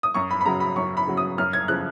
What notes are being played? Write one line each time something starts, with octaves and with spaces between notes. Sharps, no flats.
D#6
F#2 C#6
B5
B5
C#3 F#3 A#5
B5
F#2 C#6
B5
C#3 F#3
D#6
F#2 F6
G#6
C#3 F3 F#6